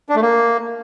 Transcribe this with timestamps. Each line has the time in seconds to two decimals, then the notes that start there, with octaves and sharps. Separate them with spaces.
0.09 D4
0.15 A3
0.22 A#3